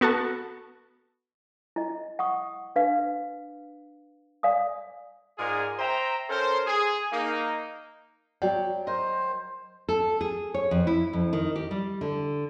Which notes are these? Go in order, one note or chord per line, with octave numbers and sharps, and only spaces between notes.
B3 F#4 A4 A5
E4 D#5
F#5 C#6 D#6
D4 B4 F5
D5 F5 G#5 D#6
G#2 F4 G#4 A#4 D5 G#5
C5 E5 G5 A#5
C#4 A4 A#4 C5
G#4
A#3 D#4
F#3 C#5 D5 G5
A#4 C5 D#5
A4
G#4
C#5
F2
E4
F2
D#3
G4
G3
D3